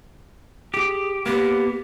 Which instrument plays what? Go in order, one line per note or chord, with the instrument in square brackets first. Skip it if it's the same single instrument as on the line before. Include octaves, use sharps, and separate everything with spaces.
[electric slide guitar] G4 [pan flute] G#4
[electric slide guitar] A#3 B3 [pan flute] G4